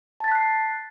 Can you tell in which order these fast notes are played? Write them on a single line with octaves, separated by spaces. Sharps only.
A5 A6 B6 F#6 C7